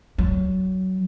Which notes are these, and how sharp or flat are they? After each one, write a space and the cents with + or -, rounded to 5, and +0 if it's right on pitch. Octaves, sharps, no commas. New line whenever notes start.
F#3 +20